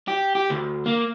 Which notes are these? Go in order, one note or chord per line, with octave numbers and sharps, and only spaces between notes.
G4
G4
D2
A#3